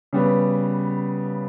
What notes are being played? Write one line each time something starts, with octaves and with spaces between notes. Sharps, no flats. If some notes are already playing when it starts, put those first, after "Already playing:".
C#3 G3 B3